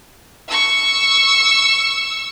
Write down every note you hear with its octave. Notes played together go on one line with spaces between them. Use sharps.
C#6 E6